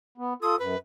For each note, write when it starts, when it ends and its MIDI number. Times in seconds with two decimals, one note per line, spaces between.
0.18 0.34 59
0.42 0.55 65
0.42 0.55 69
0.42 0.59 87
0.59 0.76 42
0.59 0.78 71